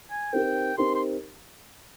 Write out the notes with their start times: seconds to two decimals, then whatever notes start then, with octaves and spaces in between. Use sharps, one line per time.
0.11 G#5
0.33 C4 D#4 G4 A#4 G5
0.78 C4 D#4 G4 A#4 C6
0.95 C6